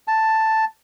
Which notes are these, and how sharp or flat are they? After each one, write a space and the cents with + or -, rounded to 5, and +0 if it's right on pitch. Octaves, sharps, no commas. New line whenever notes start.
A5 +5